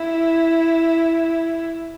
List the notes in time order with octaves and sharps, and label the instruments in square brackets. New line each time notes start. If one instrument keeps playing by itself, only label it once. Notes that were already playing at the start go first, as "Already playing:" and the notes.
Already playing: [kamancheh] E4